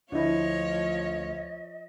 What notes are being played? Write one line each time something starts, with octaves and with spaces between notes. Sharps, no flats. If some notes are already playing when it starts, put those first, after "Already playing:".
D2 F3 D4 E4 F4 C#5 D#5